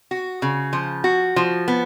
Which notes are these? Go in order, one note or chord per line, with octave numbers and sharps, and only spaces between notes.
F#4
C#3
F3
F#4
F3
B3